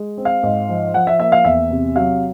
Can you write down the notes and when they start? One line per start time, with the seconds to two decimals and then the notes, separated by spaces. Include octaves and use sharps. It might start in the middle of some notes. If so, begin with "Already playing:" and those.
Already playing: G#3
0.18 C4
0.25 F5
0.43 G#2
0.69 F3
0.94 F3 F#5
1.07 E5
1.20 A#3 E5
1.32 F5
1.45 E2 E5
1.71 C3
1.96 F#3 F5